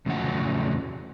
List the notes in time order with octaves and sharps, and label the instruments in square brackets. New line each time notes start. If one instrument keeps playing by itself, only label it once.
[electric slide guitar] E2 A2 C#3 F3 F#3 F#5